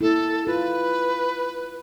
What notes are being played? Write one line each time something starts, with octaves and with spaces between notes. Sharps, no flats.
A#3 E4 A4
F4 B4